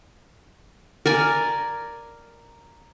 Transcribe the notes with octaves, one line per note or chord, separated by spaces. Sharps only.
A#4 D5 G#5